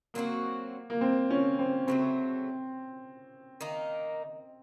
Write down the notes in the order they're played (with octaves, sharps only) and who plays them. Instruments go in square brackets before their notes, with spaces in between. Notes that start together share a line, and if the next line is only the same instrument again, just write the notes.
[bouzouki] F#3 C4 D#4 F#4 [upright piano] A#3
[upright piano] A#3
C4
C#4
C4
[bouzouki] C#3 F#3 A3 [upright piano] C4
[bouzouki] D#3 A#3 D#4